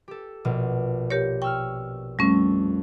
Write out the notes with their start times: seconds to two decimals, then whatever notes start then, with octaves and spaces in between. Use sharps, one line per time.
0.08 G4 A4
0.45 A#1 B2
1.10 G4 A#4 C#5
1.42 G5 C#6 E6 F6
2.19 F2 G3 A3 C#4